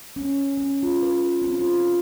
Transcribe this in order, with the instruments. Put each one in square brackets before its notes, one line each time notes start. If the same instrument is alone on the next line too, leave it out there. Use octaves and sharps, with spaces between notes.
[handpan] C#4
C#4
F4
B4
C4
F4